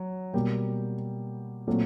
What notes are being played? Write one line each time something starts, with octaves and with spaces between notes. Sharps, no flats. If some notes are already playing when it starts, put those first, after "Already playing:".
Already playing: F#3
B2 G3 A#3 G5
A#2 F#3 A3 C4